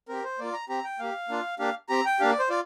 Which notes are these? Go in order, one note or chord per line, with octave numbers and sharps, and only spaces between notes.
C4 G4 A#4
C5
A#3 F4 D5
A#5
C4 G4 A#5
G5
A#3 G4 F5
A#3 D4 F4
A#3 D4 G4 F5
C4 G4 A#5
G5
A#3 D4 G4 F5
D5
C5
F4 D5